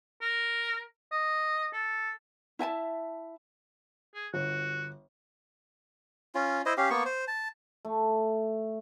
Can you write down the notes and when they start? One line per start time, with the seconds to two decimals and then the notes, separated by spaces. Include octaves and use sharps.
0.22 A#4
1.12 D#5
1.73 A4
2.59 E4 E5 G#5 A5
4.14 G#4
4.34 G1 F#4
6.35 C#4 F4
6.66 E4 C5 D#5
6.77 C#4 G4 F5
6.90 A#3 B3 C#6
7.06 C5
7.28 A5
7.85 A3